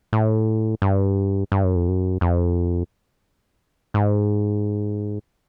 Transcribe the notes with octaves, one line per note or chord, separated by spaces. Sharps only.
A2
G2
G2
F#2
F2
F#2
F2
G#2